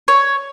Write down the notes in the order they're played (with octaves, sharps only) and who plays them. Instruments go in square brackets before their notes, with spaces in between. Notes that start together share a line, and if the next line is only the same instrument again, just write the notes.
[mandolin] C#5